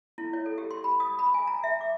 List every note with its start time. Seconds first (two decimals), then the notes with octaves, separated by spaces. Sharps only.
0.18 E4
0.33 C#5
0.46 A4
0.58 G4
0.71 C6
0.84 B5
1.00 D#6
1.19 B5
1.34 G#5
1.47 A#5
1.64 E5
1.81 D6